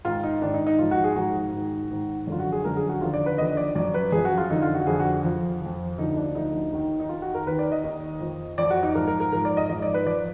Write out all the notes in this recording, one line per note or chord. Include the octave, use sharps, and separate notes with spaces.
G#2 D#3 F4
D#4
G#2 D#3 D4
D#4
D#4
G#2 F3 F4
F#4
G#4
G#2 F3 F#4
G#2 D#3
G#2 D#3
F#2 D3 F3 F4
F#4
G#4
F#2 D3 F3 A#4
G#4
F#4
D#2 D3 F3 F4
D5
B4
D#2 D3 F3 D#5
D5
F#2 F3 D5
B4
F#2 F3 G#4
F#4
F4
F2 D3 F3 D#4
F4
F#4
F2 D3 F3 G#4
F#4
F2 F3
F2 F3
D2 D3 F3 D#4
D4
D2 D3 F3 D#4
D#2 D#3
D#4
D#2 D#3 F4
F#4
A#4
D#2 D#3 B4
D5
D#5
D#2 D#3
F2 F3
F2 F3 D5
F#4
D#4
G#2 F3 A#4
A#4
A#4
G#2 F3 A#4
D5
D#5
G#2 F3 D#5
D5
B4
F3 D5